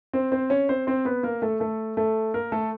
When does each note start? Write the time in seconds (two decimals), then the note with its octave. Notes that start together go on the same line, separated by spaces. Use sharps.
0.13 C4 C5
0.32 C4 C5
0.50 C#4 C#5
0.69 C4 C5
0.87 C4 C5
1.05 B3 B4
1.23 A#3 A#4
1.42 A3 A4
1.60 A3 A4
1.97 A3 A4
2.34 A#3 A#4
2.52 A3 A4